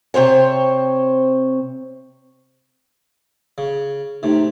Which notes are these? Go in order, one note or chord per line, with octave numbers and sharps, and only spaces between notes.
C3 C4 C5 C#5
C#3
A2 C3 D#4